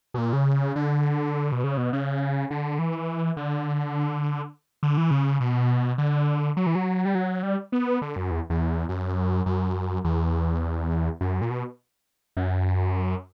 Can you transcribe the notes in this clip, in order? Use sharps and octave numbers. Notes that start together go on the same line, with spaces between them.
B2
A#2
C#3
D3
B2
C#3
B2
C#3
D3
E3
D3
D3
E3
C#3
B2
D3
F#3
E3
F#3
G3
F#3
G3
B3
D3
F#2
E2
E2
F#2
F#2
E2
F#2
A#2
B2
F#2